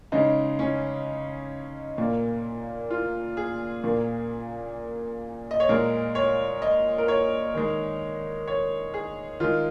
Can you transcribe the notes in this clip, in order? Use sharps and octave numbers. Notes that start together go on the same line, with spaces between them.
C#3 G#3 D#4
C#4
A#2 A#3
F4
G#4
A#2 A#3
D#5
C#5
A#2 G#3 A#4
C#5
D#5
A#4
C#5
D#3 G#3
C#5
G#4
D#3 G#3 F4